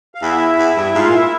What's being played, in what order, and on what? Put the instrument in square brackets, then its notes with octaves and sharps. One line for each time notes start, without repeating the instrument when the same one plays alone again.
[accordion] F5
[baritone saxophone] E2 [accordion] E4 E5
[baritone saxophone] E2
G2
[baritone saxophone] G#2 [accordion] F4 F5
[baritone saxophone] A#2
[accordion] E4 E5